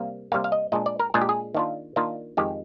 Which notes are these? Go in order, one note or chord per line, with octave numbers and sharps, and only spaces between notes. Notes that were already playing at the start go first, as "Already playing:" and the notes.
Already playing: C3 G3 A#3
C3 G3 A#3 F5
F5
D#5
A#2 G#3 D4 D#5
D5
A#4
A#2 G#3 D4 G#4
G4
G#4
D#3 A#3 D4 F4
D#3 A#3 D4 F4
F2 D#3 G#3 G4